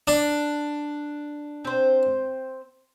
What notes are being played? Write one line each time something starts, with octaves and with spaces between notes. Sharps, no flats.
D4
C4 C5